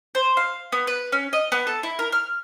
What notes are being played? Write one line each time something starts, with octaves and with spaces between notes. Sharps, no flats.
C5
F5
B3
B4
C#4
D#5
B3
A4
E4
A#4
F6